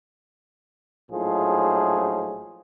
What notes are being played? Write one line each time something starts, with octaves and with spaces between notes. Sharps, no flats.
A#1 A2 F3 F#3 D#4 G#4